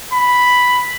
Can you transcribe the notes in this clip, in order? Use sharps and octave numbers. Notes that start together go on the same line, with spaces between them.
B5